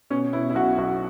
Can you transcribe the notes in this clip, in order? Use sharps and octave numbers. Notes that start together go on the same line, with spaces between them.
B2 C#4
B2 E4
E4
B1 F#4
B1 F#4